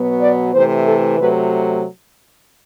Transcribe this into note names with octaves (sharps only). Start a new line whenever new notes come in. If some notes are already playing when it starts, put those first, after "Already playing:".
Already playing: B2 F#3 B3
D5
C3 E3 A3 C5
A4
C3 F#3 A3 B4